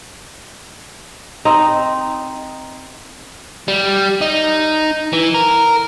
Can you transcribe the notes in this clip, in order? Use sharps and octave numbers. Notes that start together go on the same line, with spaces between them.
C4 D#4
G3
D#4
E3
A#4